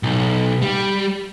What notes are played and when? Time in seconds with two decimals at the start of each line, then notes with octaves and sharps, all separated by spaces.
0.03 B1
0.62 G3